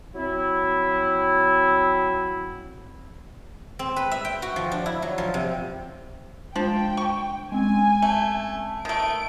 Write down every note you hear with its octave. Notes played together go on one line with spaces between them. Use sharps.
F#3 C4 E4
C4
B4
E5
G5
F#4
F3
D4
E4
F#3
F3
C3
F3 G#3 D4 G5 E7
C#6
G#3 C4 C#4 G#5
A3
D#3 A3 D7